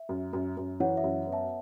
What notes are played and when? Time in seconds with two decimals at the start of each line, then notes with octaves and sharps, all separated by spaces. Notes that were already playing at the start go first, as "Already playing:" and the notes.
Already playing: E5
0.09 F#2
0.33 F#2
0.57 F#2
0.80 E3 C#5 F#5
0.97 E5
1.04 F#2
1.27 B3
1.33 E5 A5